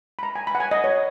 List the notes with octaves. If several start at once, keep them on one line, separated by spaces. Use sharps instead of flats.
B5
A#5
G#5
B5
F#5
G#5
D#5
C#5